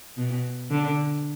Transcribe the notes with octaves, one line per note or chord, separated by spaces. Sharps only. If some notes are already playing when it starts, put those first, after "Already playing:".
B2
D3